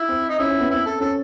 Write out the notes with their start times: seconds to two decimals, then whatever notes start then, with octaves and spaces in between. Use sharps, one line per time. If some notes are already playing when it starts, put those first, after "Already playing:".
Already playing: E4
0.09 C4
0.29 D#4
0.39 C#4 E4
0.50 C#4
0.60 B3
0.70 C4 E4
0.86 A4
1.00 C#4 A4